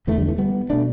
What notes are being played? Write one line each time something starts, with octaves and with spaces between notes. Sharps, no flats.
E2 D3 E3 A3
D3 G3
E3 A3
G3 B3
B2 A3 D4